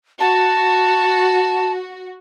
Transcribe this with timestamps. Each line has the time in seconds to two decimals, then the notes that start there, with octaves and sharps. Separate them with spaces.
0.20 F#4 A5